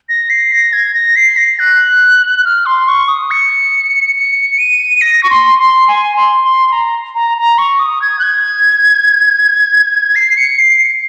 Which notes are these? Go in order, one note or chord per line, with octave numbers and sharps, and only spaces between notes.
A#6
C7
A#6
G#6
A#6
C7
A#6
F#6
F6
C6
C#6
D#6
C#7
C#7
D#7
A#6
C#6
C6
C6
G#5
C6
C6
A#5
A#5
A#5
C#6
D#6
G#6
F#6
G#6
C7
C#7
C7